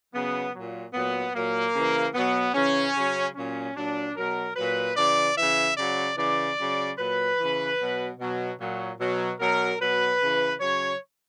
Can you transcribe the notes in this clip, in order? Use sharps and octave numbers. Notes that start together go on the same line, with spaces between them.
C#3 F#3 B3
A#2 F#3
A#2 F#3 B3
A#2 F#3 A#3
C#3 E3
B2 F#3 B3
C#3 E3 C#4
C#3 F#3
A#2 F#3 C#4
A#2 F#3 D4
B2 F#3 A#4
A#2 F#3 B4
C#3 E3 D5
C#3 E3 E5
C#3 F#3 D5
C#3 E3 D5
C#3 F#3
A#2 F#3 B4
C#3 E3
B2 F#3
B2 F#3
A#2 F#3
B2 F#3
B2 F#3 A#4
B2 F#3 B4
C#3 E3
C#3 F#3 C#5